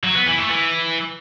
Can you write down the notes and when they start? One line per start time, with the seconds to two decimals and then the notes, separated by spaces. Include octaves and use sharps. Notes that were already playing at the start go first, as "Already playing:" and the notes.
0.03 F#3
0.15 B3
0.26 E3
0.38 A3
0.50 E3